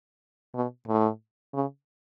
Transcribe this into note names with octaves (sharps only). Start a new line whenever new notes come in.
B2
A2
C#3